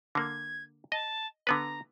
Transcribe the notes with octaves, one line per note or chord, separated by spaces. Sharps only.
D3 A#3 G#6
D#5 A5
D3 B3 B4 A#5